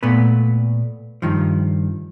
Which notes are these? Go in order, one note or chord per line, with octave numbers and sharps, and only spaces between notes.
A#2 A3 B3 B4
G2 D#3 F3